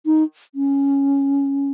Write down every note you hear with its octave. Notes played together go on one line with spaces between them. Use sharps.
D#4
C#4